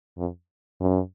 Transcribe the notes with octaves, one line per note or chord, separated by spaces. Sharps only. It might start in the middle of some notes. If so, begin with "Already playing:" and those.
F2
F#2